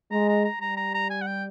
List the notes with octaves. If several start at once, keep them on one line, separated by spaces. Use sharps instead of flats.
G#3 A#5
A#5
A#5
G3 A#5
A#5
A#5
G#5
F#5
G5